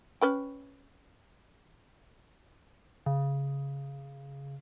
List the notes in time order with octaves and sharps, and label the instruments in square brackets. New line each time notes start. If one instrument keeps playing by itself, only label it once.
[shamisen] C#4 B4 G5
[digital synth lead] C#3